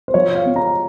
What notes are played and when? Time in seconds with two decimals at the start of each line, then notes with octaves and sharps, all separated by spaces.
0.08 C5
0.14 F3 C#5
0.35 F5
0.46 C4
0.56 A#5